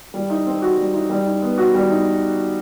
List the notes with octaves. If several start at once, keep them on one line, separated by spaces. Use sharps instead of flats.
G3
D#4
C4
F#4
G3
D#4
G3
D#4
B3
F#4
G3
D#4